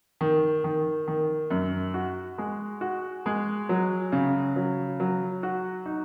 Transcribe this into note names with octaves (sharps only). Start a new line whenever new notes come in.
D#3
D#3
D#3
F#2
F#4
G#3
F#4
G#3
F#3
C#3
F#3
F#3
F#4
D#4